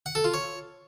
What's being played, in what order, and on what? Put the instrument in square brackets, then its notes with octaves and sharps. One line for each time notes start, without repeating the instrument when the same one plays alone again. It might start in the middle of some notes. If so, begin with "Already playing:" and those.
[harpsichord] F#5
A4
F4
C#5